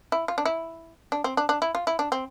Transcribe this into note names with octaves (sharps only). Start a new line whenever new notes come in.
E4
F4
D4
E4
D4
C4
D4
D4
E4
F4
E4
D4
C4